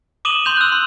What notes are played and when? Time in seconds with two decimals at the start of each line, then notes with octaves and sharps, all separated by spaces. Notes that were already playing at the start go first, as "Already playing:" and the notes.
0.25 D6 D#6 D#7 E7 F#7 G7
0.45 C6 G6 F7
0.57 E6 F#6
0.72 C6